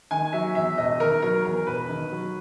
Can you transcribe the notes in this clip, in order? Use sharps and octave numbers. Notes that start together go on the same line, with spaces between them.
D#3 G#5
F#3 E5
E2 E5
E1 D#5
D#3 A#4
F#3 A#4
E2 A#4
E1 B4
D#3
F#3